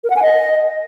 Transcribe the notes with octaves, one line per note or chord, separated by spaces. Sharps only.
A#4
F#5
G#5
D#5